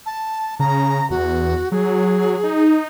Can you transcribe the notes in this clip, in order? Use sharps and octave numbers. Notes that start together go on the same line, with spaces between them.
A5
C#3 A#5
E2 F#4
F#3 G#4
D#4